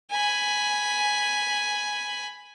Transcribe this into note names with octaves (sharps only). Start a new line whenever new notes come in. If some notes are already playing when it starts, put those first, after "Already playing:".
G#5 B5